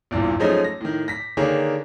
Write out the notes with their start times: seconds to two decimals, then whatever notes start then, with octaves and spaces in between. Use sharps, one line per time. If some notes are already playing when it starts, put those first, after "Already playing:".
0.11 A#1 E2 G2 A#2
0.40 F3 F#3 G#3 A3 C#4 D#4
0.64 A#6
0.81 A2 D#3
1.08 A#6 B6
1.37 D3 D#3 A#3 D4 G#4 C#5